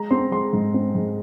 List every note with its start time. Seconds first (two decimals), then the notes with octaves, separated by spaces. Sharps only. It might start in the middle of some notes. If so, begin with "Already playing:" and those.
Already playing: G#3 A#5
0.11 C4 C6
0.32 G#3 C6
0.53 G#2
0.74 C4
0.95 G#2